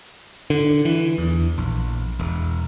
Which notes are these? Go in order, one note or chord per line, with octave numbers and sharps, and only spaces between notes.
D3
E3
E2
A#1
E1